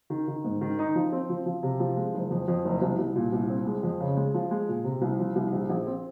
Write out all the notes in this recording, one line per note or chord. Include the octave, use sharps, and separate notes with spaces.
D#3
D#3
G#2
D#3
D#4
F3
C4
F3
F3
C3
F3
G#3
F#1
F2
F2
F#1
C2
C2
A#2
C2
C4
G#3
F2
C#3
G#3
F3
G#3
A#2
C3
C2
F3
C2
A#1
A#1
C4